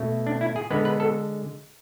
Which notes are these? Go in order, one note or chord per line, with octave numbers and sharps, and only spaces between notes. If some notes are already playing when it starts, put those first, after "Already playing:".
Already playing: B2 A3
D4
E4
G#4
D3 G#3 B3 B4
B4
A4